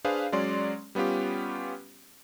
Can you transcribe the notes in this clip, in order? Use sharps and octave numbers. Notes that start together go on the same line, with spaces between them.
D4 G#4 B4 C5 F5
F#3 G#3 C#4 D5 C6
G3 B3 C#4 F4 G4